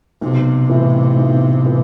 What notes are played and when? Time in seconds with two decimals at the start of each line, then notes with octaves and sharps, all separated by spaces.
0.21 B1 C3
0.69 A2 E3
1.17 B1
1.65 A2 E3